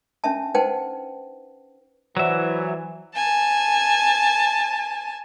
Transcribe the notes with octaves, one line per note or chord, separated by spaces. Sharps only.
C#4 D4 E5 A5
D#4 B4 C5 F#5 G5 A5
E3 F#3 C5 D5 E5 F#5
G#5 A5